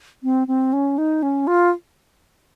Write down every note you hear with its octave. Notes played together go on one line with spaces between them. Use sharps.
C4
C4
C#4
D#4
C#4
F4